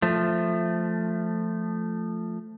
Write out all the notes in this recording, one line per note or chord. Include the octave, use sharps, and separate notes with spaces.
F3 A3